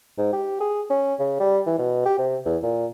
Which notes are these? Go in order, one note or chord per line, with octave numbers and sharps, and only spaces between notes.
G#2
G4
G#4
C#4
C#3
G3
E3
B2
G4
C3
E2
A#2